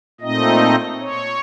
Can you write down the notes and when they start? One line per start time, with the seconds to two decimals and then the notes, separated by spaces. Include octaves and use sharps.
0.21 A#2 A3 C4 D#4 D#5
1.00 C#5